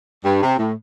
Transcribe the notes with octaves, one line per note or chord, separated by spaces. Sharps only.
G2
C3
A2